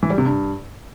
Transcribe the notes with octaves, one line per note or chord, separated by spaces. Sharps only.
E3
G3
C3
G2